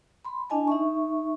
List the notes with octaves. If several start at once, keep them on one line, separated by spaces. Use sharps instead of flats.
B5 C6
D4 E4 D#5 G#5 A5
D#4 E5 C#6